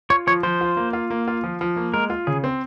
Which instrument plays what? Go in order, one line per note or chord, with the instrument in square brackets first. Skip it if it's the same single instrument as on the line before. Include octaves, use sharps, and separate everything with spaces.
[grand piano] F4 [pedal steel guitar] C#5
[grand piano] F3 [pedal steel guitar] C#5
[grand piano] F3 [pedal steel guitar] C5
[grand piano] F4
A#3
F4
A#3
F4
F3
F3
A#3
[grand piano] G#3 [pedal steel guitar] A#4
[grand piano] F4
[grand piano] C#3 [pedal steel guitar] G#4
[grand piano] C4